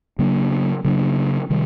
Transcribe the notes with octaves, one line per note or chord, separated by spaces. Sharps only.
C#3 F#3 A#3 D4
C#3 F#3 A#3 D4
C3 D#3 G3